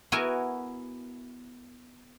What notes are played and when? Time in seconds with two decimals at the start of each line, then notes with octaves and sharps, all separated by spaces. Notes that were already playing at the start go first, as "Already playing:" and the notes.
0.12 B3 E4 F#4 A#4 G#5